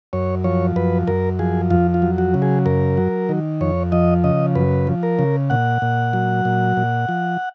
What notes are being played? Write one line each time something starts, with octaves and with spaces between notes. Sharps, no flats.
F#2 C#5
F3 C#5
F#2 B4
F#2 A#4
F3 G#4
F2 F4
F4
F#3
F#4
C#3
G#4
F#2 A#4
F#3
D#3
F2 C#5
F3 D#5
C#3 D#5
F#2 B4
F3
A#4
C#3
A#2 F#5
A#2
F#3
A#2
A#2
F3